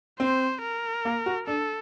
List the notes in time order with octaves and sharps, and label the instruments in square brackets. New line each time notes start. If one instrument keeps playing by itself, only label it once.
[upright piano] C4 [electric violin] C5
[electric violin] A#4
[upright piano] A#3
F#4
[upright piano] D4 [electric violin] A4